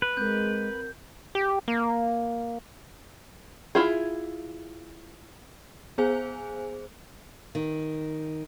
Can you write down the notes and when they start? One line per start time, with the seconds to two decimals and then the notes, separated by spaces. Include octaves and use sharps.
0.02 B4
0.17 G#3 C4 A#4 G6
1.35 G4
1.68 A#3
3.75 E4 F4 G#4
5.98 B3 G#4 C5 G#5
7.55 D#3